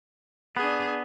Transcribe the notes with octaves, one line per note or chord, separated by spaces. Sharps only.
B3 D4 G#4